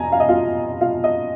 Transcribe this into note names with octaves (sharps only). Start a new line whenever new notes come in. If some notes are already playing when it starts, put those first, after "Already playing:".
Already playing: F2 G#5 A#5
F5
D#5
F4 F5
F4 F5
D#5